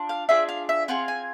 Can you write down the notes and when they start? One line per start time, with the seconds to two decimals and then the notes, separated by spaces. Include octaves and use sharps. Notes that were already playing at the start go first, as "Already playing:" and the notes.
Already playing: D4 F4
0.09 F5
0.29 D4 F4 G#4 E5
0.49 F5
0.69 E5
0.88 C4 F4 G#4 F#5
1.08 G#5